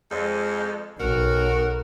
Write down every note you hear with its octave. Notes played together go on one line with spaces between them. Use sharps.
F2 G#3
B1 F#4 A#4